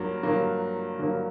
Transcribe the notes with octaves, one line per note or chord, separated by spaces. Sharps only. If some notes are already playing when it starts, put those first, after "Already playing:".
Already playing: G2 F#3 A#3
G2 F#3 A#3
G2 F#3 A#3